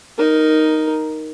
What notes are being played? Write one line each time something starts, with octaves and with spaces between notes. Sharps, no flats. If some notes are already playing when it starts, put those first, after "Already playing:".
D#4 A#4